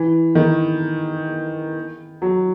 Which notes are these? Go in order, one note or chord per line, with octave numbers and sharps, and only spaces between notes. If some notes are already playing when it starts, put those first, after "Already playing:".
Already playing: E3
D#3
F#3